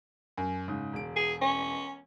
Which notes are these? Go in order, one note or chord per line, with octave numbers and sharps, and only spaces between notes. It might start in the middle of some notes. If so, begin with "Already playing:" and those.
F#2
G#2 C#3
E1 D7
G#4
C#4